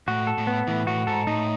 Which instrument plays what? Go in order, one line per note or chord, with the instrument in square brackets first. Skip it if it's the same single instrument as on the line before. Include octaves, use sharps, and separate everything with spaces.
[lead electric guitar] A2 [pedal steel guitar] F#4
[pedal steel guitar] A4
[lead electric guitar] A2
[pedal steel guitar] B3
[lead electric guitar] A2 [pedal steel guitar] E3
[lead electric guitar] A2 [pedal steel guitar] F#4
[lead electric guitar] G#2 [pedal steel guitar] A4
[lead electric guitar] A2 [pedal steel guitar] D#4